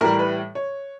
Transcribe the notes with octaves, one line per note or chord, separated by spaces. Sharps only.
A2 E3 G3 A#4
B4
C#5